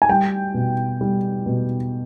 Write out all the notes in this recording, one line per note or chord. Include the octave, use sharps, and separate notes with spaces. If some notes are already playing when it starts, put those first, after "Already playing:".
G#5
G3 G5
B2
G3
B2